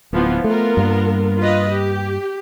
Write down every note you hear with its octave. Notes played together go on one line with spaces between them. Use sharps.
D1 E3 F3 B3
A3 B3 F4 A#4
G2 G3 A#3
F4 B4 D#5
G4